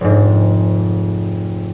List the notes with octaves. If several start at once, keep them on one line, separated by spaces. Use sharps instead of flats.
F1 G#2